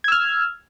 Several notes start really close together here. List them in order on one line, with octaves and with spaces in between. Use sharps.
G#6 E6 F6